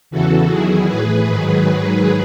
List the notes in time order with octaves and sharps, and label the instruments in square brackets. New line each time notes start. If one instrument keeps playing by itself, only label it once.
[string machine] E2 C#3 E3 F#4 A4
E2 D#3 F#3 E4 G#4
A2 E3 G#4 B4
G#2 D#3 F#3